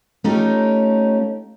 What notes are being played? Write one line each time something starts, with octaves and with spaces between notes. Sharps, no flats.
A3 C#4 D#4 F4 G4